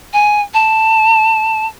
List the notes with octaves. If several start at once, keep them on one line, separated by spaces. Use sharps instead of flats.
G#5
A5